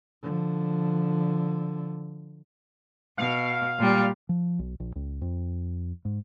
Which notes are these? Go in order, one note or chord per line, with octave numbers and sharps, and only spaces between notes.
D3 F3
B2 F5
A#2 G3
F3
B1
A#1
C#2
F2
G#2